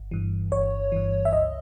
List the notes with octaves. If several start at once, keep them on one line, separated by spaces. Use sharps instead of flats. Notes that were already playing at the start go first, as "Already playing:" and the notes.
Already playing: G1
G2 E3
G1 C#5
G2 E3
E5
C#2 D#5